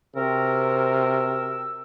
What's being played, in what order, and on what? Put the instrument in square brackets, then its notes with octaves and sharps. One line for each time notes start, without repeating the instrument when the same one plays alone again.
[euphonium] C3 [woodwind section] C4 F#4 A#4 [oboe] E6